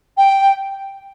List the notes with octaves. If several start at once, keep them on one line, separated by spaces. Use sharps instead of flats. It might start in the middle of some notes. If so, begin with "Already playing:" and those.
G5